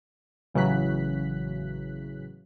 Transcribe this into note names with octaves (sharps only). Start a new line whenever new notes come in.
A1 C#3 E3 F#3 F#6 B6